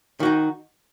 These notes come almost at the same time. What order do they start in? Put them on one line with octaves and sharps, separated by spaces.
D#3 F#4 D#4